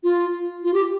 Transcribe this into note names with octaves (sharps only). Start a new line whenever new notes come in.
F4
F4
G4